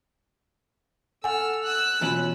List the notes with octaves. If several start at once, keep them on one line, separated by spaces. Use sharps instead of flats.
A4 F#5 G#5 E6 F6
E6 F#6
E2 B2 C#4 F4